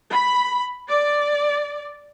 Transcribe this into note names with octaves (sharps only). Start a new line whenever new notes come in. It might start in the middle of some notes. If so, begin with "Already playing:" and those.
B5
D5